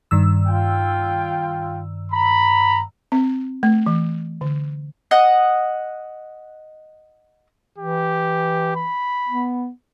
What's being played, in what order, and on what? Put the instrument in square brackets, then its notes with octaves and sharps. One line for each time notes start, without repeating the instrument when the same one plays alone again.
[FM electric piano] G2 D#3 E6
[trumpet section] F4 G5
A#5 B5
[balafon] C4
A3
E3
D3
[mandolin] D#5 F#5 D#6
[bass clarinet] E3 [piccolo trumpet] G4
[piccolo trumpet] B5
[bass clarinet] B3